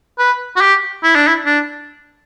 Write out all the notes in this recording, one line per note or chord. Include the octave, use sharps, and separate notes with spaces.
B4
F#4
G4
E4
D4
E4
D4